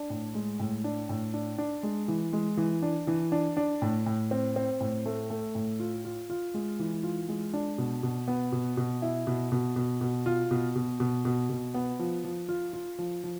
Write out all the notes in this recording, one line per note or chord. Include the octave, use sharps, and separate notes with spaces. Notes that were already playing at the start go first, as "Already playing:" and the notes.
Already playing: D4
A2
G#3
A2
D4
A2
D4
D4
G#3
E3
G#3
E3
D4
E3
D4
D4
A2
A2
C4
C4
A2
A3
A3
A2
F4
F4
F4
G#3
E3
F4
G#3
D4
B2
B2
B3
B2
B2
E4
B2
B2
B2
B2
F4
B2
B2
B2
B2
B2
B3
F3
F3
F4
F4
F3
F3